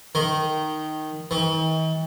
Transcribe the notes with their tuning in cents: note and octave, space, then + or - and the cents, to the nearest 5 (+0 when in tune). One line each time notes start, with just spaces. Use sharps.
D#3 -5
D#3 +45